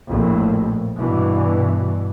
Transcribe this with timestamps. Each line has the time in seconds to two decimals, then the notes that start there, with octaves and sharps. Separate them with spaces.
0.10 A#1 F2 A2
0.98 G2 B2 E3